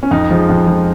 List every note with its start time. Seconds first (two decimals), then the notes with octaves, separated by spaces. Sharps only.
0.03 C#4
0.11 F2 D#4
0.31 F3 G#3
0.49 F2
0.67 F3 G#3